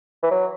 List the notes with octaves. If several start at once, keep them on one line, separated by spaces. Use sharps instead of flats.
E3
F#3